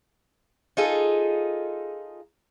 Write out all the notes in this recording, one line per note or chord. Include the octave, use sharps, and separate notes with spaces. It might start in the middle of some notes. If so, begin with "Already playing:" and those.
D#4 F4 G#4 A4